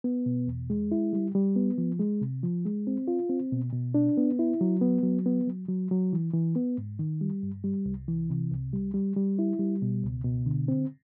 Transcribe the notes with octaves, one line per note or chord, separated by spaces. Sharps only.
B3
B2
E2
G#3
E4
G3
G3
B3
F3
G#3
C3
F3
G#3
C4
F4
C4
B2
B2
D4
B3
E4
F#3
B3
F#3
B3
F#3
F#3
F#3
E3
E3
B3
G#2
D#3
G3
G2
G3
C2
E3
C3
C2
G3
G3
G3
E4
G3
B2
C#2
B2
D3
C4